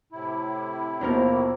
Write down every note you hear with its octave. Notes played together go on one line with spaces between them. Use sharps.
A2 C3 E4
D#2 B2 D#3 F3 A#3 A#4